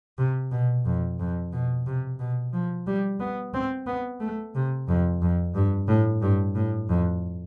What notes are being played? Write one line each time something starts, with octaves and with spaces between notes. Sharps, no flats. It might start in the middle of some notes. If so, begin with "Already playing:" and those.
C3
B2
F2
F2
B2
C3
B2
F3
G3
B3
C4
B3
A3
C3
F2
F2
G2
A2
G2
A2
F2